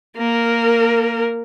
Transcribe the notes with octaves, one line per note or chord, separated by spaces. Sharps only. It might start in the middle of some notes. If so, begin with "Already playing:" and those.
A#3 A#4